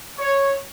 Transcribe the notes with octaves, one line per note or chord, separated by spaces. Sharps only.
C#5